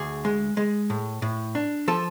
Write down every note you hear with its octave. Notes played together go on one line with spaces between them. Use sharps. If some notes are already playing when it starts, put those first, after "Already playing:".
Already playing: D2 G#4
G#3
G#3
A2
A2
D4
F3 A4